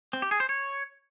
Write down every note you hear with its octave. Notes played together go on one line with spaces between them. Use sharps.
C4
G4
G#4
C5
C#5